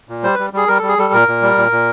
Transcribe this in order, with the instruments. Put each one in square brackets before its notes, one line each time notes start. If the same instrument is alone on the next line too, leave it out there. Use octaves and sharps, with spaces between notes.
[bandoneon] A#2
G3 C5
G3 B4
G3 G#4
G3 A#4
G3 A4
G#4
G3 A4
A#2 A#4
A#2
G3
A#2
A#2